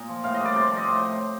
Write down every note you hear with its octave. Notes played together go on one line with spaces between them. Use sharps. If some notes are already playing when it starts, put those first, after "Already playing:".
Already playing: A#2 D#5
F3
A2 F5
D#5
G3
D5
C3 C5
F3 D5
D#5
A2